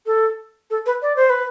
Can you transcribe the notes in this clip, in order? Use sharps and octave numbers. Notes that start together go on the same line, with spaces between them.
A4
A4
B4
D5
C5
B4